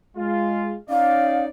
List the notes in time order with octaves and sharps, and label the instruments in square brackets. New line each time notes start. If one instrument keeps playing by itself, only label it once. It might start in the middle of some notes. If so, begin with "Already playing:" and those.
[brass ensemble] G#3 F4
[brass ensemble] C#4 D#4 D5 [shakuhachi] F5